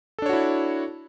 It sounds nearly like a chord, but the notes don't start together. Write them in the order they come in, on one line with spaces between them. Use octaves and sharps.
A4 D4 C#5 F#4 E4